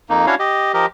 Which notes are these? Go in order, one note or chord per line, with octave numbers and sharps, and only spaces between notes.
F2 A#3 D#4
C#4 D4 E4 F#4 C#5 F5
G4 D#5
F3 G4 A#4 D#5